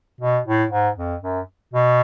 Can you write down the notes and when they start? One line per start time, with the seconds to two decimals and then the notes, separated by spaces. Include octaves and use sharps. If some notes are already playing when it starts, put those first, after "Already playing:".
0.21 B2
0.46 A2
0.71 G#2
0.97 F2
1.22 F#2
1.73 B2